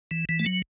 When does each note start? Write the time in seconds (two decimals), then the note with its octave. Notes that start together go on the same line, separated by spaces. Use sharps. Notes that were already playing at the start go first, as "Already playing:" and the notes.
0.11 E3
0.29 E3
0.39 A3
0.46 F#3